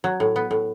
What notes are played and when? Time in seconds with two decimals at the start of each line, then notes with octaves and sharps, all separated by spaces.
0.04 F#3
0.20 A2
0.36 B3
0.51 A2